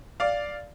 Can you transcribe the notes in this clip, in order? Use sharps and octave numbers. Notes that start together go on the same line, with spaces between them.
D5 F5